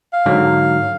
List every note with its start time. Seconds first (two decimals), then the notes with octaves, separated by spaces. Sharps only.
0.13 F5
0.26 G#2 D3 F#3